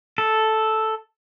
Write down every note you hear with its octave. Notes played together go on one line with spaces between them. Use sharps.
A4